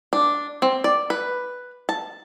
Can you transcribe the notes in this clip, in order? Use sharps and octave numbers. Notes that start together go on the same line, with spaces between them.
D4
C4
D5
B4
A5